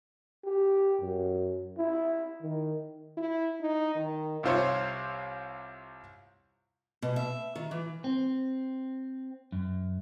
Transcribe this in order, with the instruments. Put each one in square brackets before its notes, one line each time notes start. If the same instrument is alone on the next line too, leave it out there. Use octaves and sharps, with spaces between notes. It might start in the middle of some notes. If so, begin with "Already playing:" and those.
[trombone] G4
F#2
E4
D#3
[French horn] E4
D#4
D#3
[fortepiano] C2 C3 F4 C5 C#5
[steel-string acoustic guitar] B2
E5
D#3
E3
[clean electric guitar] C4
F#2